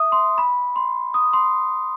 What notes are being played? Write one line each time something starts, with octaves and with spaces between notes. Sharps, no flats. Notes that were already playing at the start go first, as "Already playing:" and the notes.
Already playing: E5 D#6
C6
B5
C6
D#6
C6